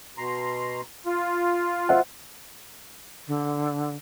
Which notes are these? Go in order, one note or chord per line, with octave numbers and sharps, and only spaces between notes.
B2 A#5 C6
F4
C5 E5 F#5
D3